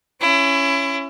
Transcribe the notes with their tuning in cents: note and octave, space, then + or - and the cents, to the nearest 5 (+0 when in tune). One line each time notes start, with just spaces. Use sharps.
C#4 +0 E4 +30